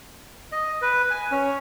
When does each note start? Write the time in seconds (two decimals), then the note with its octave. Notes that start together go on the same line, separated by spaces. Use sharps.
0.52 D#5
0.82 B4
1.11 G#5
1.31 C#4